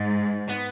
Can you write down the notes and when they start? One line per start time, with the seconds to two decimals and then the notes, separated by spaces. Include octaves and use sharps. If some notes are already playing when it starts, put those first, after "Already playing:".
Already playing: G#2
0.49 B3